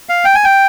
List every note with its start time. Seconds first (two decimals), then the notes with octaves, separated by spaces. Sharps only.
0.09 F5
0.25 G5
0.35 G#5
0.44 G5